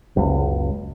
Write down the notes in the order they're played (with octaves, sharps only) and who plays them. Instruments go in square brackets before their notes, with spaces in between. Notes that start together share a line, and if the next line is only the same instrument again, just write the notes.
[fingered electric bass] F#1 C#2